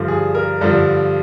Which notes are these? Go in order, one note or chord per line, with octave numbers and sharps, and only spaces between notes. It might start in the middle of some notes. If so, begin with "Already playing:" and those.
Already playing: G2 D3 F3
G#4
A#4
G2 D3 F3